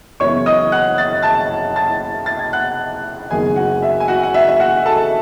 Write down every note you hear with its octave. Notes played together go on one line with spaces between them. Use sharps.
F#1 F#2 E3 G#3 B3 C#5 C#6
D#5 D#6
F#5 F#6
A6
A5 A6
A5 A6
A6
G#6
F#5 F#6
F#1 F#2 D#3 G#3 B3 G#4 G#5
F#4 F#5
E5
G#5
F#4 F#5
F#5
E5
E5
F#4 F#5
A4 A5